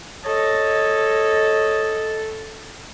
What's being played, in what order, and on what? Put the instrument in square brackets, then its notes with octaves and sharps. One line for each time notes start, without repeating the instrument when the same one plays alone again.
[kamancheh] A4 [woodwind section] C#5 D#5